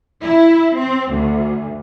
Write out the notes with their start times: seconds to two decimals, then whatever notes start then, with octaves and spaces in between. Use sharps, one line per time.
0.22 E4
0.74 C4
1.11 D2